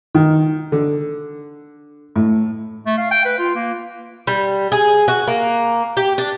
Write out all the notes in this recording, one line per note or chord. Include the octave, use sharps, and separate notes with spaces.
D#3
D3
A2
A3
F5
G5
B4
F4
A#3
G3
G#4
F#4
A#3
G4
D4